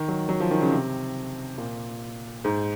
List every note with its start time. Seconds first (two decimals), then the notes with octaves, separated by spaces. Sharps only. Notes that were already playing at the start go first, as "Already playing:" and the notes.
Already playing: D#3
0.08 F#3
0.29 F#3
0.40 F3
0.51 D#3
0.61 C#3
0.72 C3
1.58 A#2
2.45 G#2